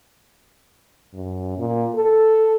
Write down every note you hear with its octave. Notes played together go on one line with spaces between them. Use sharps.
F#2
A#2
A4